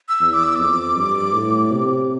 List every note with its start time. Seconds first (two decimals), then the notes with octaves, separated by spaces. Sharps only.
0.09 E6
0.20 E2
0.34 D6
0.44 E6
0.55 F2 D6
0.96 G2
1.34 A2
1.71 C3